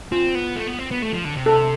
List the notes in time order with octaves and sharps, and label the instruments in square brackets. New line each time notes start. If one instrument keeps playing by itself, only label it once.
[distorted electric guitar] C4 [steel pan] F4
[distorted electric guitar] B3
A3
B3
C4
B3
A3
F3
D3
C3
[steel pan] A4